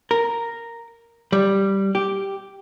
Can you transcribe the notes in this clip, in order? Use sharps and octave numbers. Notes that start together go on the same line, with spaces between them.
A#4
G3
G4